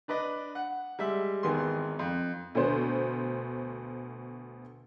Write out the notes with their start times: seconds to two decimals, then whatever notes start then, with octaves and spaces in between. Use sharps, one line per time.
0.08 D4 B4 D5 D#5
0.55 F#5
0.99 G3 G#3 E5
1.43 G#1 E2 D#3 B3 G#4 C6
1.99 F2
2.55 D2 B2 C5